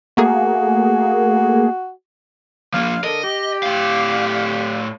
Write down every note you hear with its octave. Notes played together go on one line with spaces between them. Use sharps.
A3 A#3 F#4 G#4
F3 A#3 F5
D3 A4 A#4 D#5
G4
A2 F5